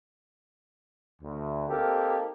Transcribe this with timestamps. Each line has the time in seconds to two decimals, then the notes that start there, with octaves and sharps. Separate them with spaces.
1.22 D2
1.69 A#3 C4 D#4 G4 A4 A#4